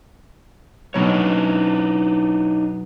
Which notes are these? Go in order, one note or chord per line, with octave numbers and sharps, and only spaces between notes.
B2 F#3 D4 D#4 C#5